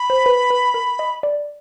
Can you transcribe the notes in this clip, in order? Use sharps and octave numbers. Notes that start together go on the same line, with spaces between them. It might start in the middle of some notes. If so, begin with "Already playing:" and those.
Already playing: B5
C5
B4
B4
A#4
D#5
D5